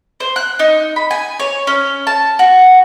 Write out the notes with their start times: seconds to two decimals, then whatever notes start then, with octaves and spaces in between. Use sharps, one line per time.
0.20 C5
0.36 F#6
0.59 D#4
0.96 B5
1.11 G#5
1.40 C#5
1.67 C#4
2.07 A5
2.39 F#4